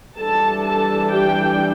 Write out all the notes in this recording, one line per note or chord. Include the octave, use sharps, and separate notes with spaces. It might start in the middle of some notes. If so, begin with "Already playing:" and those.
E3 G3 D4 A4 A5
A4 A5
G4 G5